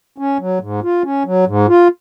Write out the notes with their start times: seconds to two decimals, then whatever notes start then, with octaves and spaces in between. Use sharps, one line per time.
0.18 C#4
0.39 F#3
0.61 G#2
0.83 F4
1.04 C#4
1.25 F#3
1.47 G#2
1.68 F4